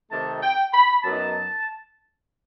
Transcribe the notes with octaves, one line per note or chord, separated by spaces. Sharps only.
C3 D#3 A3 D#4 A5
G5
B5
F#2 F#3 B3 D#4 A5